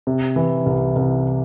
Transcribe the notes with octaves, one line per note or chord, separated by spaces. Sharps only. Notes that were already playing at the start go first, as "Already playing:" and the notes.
C3
E3
C2
C2